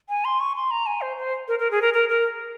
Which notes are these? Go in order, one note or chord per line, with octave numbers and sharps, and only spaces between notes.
G#5
C6
C#6
C6
A#5
G#5
C5
C5
A#4
A#4
G#4
A#4
A#4
A#4